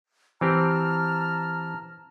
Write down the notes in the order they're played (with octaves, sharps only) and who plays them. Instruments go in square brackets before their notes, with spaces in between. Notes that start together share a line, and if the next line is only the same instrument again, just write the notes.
[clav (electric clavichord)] E3 C4 G4 [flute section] A5 A#5 F6